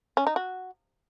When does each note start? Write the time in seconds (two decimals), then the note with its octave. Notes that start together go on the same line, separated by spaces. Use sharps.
0.17 C#4
0.27 D#4
0.36 F#4